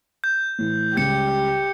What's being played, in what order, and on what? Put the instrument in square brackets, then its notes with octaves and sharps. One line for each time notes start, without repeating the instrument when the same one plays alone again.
[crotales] G6
[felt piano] A2 E3
[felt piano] C#2 C#3 G3 [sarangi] G4 [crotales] G6 C#7